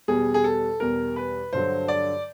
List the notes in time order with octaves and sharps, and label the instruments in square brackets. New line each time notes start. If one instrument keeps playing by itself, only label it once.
[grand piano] E2 B2 G3 G#4
G#4
A4
E2 B2 G3 A#4
B4
G2 D3 F#3 C5
D5